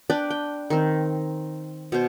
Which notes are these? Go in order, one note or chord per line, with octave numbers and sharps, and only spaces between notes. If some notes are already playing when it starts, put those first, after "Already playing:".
D4 B4 D5 G5
G5
D#3 C4
B2 C5